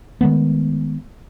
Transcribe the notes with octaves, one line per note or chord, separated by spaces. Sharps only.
D#3 G#3 A3 B3